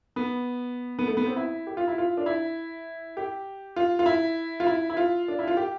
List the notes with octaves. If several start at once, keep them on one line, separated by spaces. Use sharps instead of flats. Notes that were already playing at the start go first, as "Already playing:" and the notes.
B3
B3
A3
B3
C4
E4
G4
F4
E4
F4
D4
E4
G4
F4
F4
E4
F4
E4
E4
F4
D4
E4
F4
G4